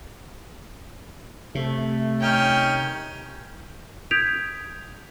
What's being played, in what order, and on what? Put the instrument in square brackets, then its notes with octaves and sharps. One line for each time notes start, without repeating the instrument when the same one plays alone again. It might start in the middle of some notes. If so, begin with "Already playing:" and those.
[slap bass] C3 [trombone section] A3
[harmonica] D#3 C#4 [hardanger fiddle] G5
[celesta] D#6 G6 G#6 B6 D7 F7